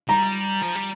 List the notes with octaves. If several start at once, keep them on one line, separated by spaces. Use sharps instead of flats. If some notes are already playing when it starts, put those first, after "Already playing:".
G3 A#5
F3
G3